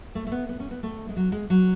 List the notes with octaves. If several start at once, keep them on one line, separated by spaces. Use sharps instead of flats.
A3
A3
B3
B3
C#4
B3
A3
G#3
F#3
G#3
F#3